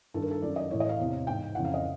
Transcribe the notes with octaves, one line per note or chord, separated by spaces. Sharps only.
G2 D#3 A4
A#4
A4
F#2 D#3 D5
D#5
A2 E3 C#5
D#5
F5
E2 C3 E3
G#2 E3 G5
F2 C#3 E3 F#5
F5
D#5